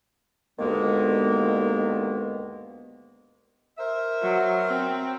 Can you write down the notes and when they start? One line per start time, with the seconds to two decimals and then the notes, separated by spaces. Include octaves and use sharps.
0.59 D2 G2 D#3 G#3 A#3 B3
3.78 A#4 C5 E5
4.22 F#3
4.68 C4